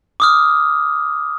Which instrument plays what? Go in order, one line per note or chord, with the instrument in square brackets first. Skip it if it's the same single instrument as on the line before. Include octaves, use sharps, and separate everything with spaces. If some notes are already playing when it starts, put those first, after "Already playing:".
[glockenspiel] D6 D#6 F6